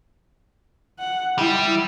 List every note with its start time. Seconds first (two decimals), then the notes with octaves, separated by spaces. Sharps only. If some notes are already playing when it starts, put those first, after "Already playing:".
1.00 F#5
1.38 G3 E4